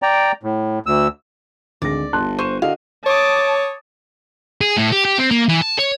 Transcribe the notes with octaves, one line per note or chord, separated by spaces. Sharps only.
D5 G5 A#5
A2
D2 E6
G#1 D2 G#3 D5 A#6
G1 A5 C6 F#6
C5 C#6 D#7 E7
D3 F#4 D#5 F5
C#5 A5 D6 D#6
G#4
A2
G4
G4
C4
A#3
E3
A5
C#5